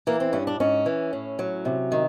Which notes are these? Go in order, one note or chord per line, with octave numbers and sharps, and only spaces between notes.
E3 A#3
C4
G2 C#4
D4
G#2 C#4
E3
A2
F#3
C3
D#3